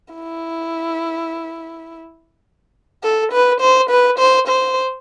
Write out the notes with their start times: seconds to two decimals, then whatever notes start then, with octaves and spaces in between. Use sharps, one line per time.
0.14 E4
3.03 A4
3.32 B4
3.61 C5
3.90 B4
4.19 C5
4.47 C5